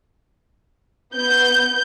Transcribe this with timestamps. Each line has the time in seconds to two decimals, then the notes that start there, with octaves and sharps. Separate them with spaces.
1.15 B3 G6